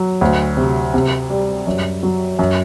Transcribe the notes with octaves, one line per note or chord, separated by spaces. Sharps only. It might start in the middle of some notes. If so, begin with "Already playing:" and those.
Already playing: F#3
D2
C3
C3
G3
F#2
F#3
F#2